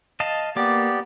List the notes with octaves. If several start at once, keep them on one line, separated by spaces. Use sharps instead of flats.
D#5 F5 A5
A#3 B3 G4 D5 D6